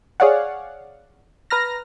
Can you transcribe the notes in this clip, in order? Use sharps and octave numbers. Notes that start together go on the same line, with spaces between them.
G#4 C#5 D5 F5 F#5
B4 A#5 F6 A#6